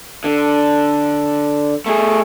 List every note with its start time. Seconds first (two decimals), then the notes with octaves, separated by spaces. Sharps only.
0.24 D3
1.86 A3 G#4